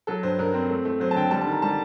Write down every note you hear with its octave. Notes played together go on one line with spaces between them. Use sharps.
F#3 A4
G2 C5
G2 A#4
C4
A3
A3
F#3 C5
A5
D3 G5
G3 A5
A5
D#3
A#5
G3 A5